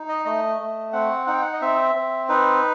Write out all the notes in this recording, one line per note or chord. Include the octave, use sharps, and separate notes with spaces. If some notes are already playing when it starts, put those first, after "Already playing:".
Already playing: D#4
D#5
A3 D#5
A3
C4 F#5
D#4 F#5
G5
F#5
D#5
C4 E5
C4
D#4 B4